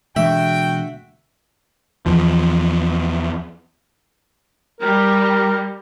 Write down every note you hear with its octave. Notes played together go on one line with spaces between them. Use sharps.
B2 D3 E3 G#3 F#4 E5 G5
E2 F3
G3 A#4